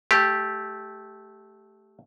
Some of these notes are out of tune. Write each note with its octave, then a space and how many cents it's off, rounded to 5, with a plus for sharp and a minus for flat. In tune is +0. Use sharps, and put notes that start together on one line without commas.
A3 -15 G4 +0